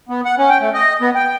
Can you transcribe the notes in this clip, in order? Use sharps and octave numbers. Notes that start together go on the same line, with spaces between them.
B3
F#5
C#4
G5
A3
D#5
B3
G5